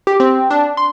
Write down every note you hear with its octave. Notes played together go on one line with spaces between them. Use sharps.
G4
C4
D4
C6